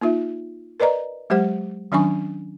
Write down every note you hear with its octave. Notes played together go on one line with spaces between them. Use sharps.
A#3 D#4 F4 E5
A#4 B4 D5 D#5 A#5
F#3 G#3 G4 C5 F#5
D#3 F#3 C#4 D4 G#5 C#6